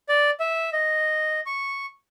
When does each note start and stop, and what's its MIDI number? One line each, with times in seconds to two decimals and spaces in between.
0.09 0.30 74
0.40 0.70 76
0.73 1.40 75
1.46 1.86 85